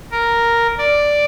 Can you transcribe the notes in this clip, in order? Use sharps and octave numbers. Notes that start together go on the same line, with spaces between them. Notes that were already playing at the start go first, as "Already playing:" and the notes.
A#4
D5